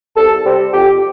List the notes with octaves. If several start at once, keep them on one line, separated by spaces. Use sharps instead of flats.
C2 A4
C3 G3 C4
F2 G4